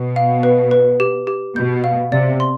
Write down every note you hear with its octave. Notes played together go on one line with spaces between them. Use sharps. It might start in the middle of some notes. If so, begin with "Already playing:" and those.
Already playing: B2
F5
B4
B4
G4
G4
B2 G6
F5
C3 D5
C6